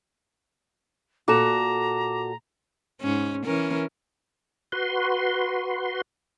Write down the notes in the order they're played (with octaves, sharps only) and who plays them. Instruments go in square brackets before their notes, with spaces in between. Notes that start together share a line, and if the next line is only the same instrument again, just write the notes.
[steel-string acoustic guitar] A#2 F#4 A4 [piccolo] A#5 [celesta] D6 E7
[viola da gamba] G#2 C#4
E3 C#4 A#4
[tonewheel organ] F#4 B4 C6